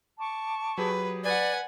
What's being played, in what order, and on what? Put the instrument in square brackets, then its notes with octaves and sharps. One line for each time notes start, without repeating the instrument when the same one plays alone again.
[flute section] A5 C#6 D6
[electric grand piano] F#3 G4 G#4 [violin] B4
[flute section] B4 [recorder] D5 [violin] F#5 G#5